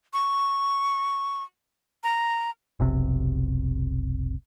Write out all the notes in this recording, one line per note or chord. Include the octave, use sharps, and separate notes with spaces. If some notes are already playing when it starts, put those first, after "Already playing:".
C#6
A#5
F1 B1 C3